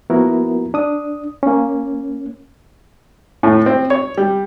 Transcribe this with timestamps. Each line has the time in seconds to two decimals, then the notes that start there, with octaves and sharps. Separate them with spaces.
0.10 F3 A#3 B3 E4 F#4 A#4
0.74 D4 D#6
1.43 A#3 C#4
3.43 A2
3.66 C4
3.90 C#5
4.17 G3